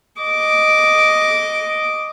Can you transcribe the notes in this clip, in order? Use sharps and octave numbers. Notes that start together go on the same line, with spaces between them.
D#5 D6